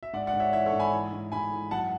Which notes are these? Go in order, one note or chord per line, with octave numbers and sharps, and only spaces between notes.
E5
G#2 D5 F#5
D5 F#5
G#2
C#5 E5
E3 C#5 E5
A4 C#5
G#2
G#5 B5
E3
G#2
G#2 G#5 B5
E3
F#2 F#5 A5